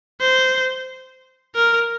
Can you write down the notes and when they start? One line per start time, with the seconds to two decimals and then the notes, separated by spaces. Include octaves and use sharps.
0.20 C5
1.55 A#4